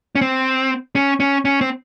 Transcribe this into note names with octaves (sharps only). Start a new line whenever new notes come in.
C#4
C4
C#4
C#4
C#4
C4